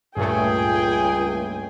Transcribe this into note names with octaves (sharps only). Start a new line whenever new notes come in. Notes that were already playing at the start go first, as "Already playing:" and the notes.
C#2 G2 A#2 A3 G#4 G5 G#5